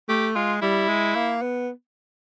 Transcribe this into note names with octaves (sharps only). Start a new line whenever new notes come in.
A3 G4
G#3 F4
G3 E4
G#3
A#3
B3